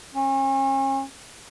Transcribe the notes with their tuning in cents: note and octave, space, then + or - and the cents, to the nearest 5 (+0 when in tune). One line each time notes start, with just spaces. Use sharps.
C#4 -40